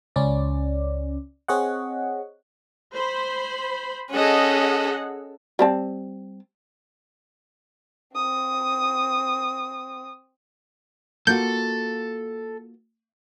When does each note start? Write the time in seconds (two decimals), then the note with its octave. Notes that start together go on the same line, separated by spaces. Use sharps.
0.16 C#2 C#4 D5
1.48 C4 G#4 C#5 D#5 F#5
2.95 C5 B5
4.11 C#4 G#4 A4 D#5 F#5
5.59 G3 C4 A5
8.15 C4 D#6
11.27 A#3 F4 F#4 A4 G6